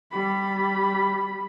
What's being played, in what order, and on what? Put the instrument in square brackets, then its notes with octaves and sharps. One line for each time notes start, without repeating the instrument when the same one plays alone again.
[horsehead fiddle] G3 B5